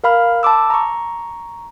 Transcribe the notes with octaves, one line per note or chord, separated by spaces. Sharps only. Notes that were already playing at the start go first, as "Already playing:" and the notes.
A#4 F5 B5 F6
A5 B5 D6 E6
A#5 C#6